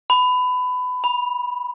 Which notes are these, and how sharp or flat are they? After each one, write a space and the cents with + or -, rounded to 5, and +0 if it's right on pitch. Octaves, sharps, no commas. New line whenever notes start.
B5 +20
B5 -20